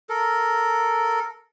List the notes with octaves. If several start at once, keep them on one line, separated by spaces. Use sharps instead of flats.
A4 A#4